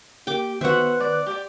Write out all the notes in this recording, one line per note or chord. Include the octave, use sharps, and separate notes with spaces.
A#3 G4 G5 D6
D#3 B3 F#4 B4 C5 E5 F#5
D5
G4 D5